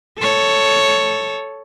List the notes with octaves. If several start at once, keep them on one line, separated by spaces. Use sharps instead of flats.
A4 C#5